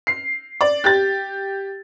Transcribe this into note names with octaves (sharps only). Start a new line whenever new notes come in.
C7
D5
G4 A6